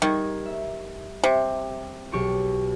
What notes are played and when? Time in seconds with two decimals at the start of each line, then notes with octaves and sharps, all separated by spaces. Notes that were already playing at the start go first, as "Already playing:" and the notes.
0.02 D#3 G3 G#6
0.46 E5
1.24 C3
2.12 B1 G4 C#6